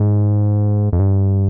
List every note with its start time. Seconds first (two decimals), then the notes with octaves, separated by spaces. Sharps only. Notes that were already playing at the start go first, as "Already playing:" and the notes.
Already playing: G#2
0.93 F2
0.99 G2